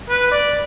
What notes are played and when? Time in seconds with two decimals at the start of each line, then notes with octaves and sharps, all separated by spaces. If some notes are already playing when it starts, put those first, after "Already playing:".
0.10 B4
0.32 D5